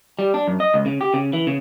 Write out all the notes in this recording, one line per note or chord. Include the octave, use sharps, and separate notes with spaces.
G3
D4
F#2
D#5
C#2
C#3
G4
C#3
E3
C#3